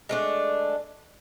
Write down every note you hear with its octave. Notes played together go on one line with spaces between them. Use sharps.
G#3 A3 D4